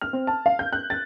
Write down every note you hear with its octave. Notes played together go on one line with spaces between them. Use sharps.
F6
C4
A5
F5
G6
F#6
A6